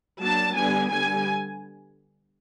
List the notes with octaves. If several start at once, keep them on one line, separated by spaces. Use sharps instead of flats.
F#3 A#3 D4 A5
D3 G3 B3 D4 G#5
D3 G3 B3 G#5